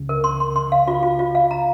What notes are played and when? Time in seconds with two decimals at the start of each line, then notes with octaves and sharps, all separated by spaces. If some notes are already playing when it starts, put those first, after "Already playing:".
Already playing: C#2 C#3
0.09 A#4
0.24 C6
0.40 C6
0.56 C6
0.72 F5
0.87 F4
1.03 F4
1.19 F4
1.35 F5
1.51 A#5